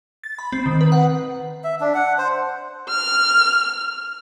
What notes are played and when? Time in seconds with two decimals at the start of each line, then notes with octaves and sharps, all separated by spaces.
0.24 A6
0.39 B5
0.52 C4
0.66 D#3
0.81 B4
0.92 F#5
1.64 E5
1.80 D4
1.95 F#5
2.18 C5
2.89 F6